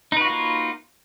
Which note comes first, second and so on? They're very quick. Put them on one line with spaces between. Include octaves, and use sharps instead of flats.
D#4 B4 F#4 F4 A#3